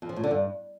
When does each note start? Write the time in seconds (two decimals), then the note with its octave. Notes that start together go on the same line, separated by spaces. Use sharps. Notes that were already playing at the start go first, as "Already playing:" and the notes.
0.02 F2
0.09 F3
0.16 A2
0.24 D3
0.31 G2